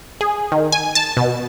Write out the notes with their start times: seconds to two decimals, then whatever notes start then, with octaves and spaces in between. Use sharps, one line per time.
0.21 G#4
0.52 D#3
0.72 G#5
0.95 A5
1.17 B2